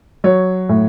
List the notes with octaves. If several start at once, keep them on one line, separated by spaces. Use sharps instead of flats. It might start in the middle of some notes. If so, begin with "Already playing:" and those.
F#3 C#5
A2